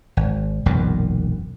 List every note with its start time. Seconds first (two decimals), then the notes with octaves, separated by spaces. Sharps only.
0.17 G#1
0.66 E1 B1 F#2 A#2